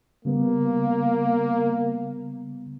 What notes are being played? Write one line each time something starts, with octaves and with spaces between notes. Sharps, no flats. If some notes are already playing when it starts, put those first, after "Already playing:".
C#3 G3 A#3 B3